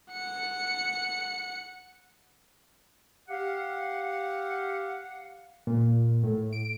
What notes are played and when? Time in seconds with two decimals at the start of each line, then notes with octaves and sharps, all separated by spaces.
0.13 F#5 C#7
3.29 G4 F5 F#5
5.67 A#2
6.23 A2
6.53 D7